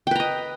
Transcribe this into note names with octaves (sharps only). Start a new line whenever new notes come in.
B4 D#5 G5 A#5